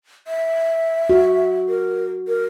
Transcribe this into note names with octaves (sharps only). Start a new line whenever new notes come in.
E5
F#4
A#4
A#4